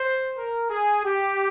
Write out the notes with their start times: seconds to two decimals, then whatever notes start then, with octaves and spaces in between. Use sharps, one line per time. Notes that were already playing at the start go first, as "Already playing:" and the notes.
Already playing: C5
0.37 A#4
0.70 G#4
1.05 G4